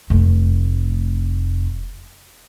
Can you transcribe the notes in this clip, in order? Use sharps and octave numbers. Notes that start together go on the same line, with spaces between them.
F1 A3